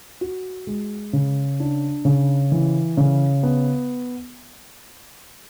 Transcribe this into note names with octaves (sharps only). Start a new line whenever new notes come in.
F#4
G#3
C#3
D4
C#3
E3
C#3
B3